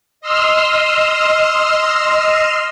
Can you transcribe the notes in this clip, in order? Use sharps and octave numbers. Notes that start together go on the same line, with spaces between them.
D#5 C6 E6 F6